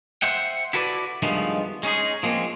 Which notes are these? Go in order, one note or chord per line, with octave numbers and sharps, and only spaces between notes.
C5 E5 F#5 G5
E4 F#4 A4 B4 C#5 D5
G2 D#3 F3 G#3 A3 B3
G#3 C#4 D#4 G#4
F3 G#3 A#3 C4 C#4